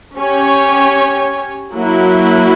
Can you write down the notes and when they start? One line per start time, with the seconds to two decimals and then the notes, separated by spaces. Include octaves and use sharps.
0.16 C#4 G4 C#5
1.73 F#3 A#3 E4